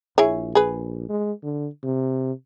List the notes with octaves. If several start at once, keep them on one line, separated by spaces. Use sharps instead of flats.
A#1 E4 G#4 C#5
G#4 B4
G#3
D3
C3